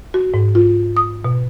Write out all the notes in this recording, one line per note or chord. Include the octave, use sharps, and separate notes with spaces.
F#4
G#2
F4
D#6
B2